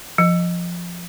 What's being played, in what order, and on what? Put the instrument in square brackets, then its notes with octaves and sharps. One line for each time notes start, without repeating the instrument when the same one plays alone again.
[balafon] F3